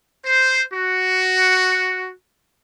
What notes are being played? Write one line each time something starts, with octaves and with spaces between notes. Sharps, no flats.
C5
F#4